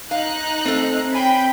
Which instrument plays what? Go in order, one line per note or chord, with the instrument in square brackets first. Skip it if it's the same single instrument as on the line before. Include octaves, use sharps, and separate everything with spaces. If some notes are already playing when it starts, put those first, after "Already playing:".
[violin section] D#4 A#5 F#6 [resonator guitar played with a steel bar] F5
[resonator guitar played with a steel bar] A3 A4 [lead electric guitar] C4
[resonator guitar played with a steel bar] C#5 G#5 [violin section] G5 B5